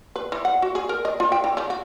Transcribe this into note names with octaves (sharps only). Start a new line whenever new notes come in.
B4
E3
F#5
F#4
G#4
A#4
D#5
F4
G5
E3
C#3
F#4